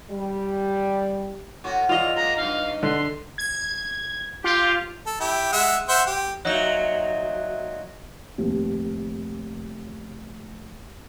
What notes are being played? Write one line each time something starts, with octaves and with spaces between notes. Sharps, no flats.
G3
A2 C#4 F#4
E2 F4 D#5 F7
G#3 A#3 A#5
G2 D#4 F5
D3 C6
G#6
F4 G4
A4
E4 G4
G#3 E5 F#5
C5 E5 F#5
G4
A#2 F#3 D#4 F#4 E5
F1 D#2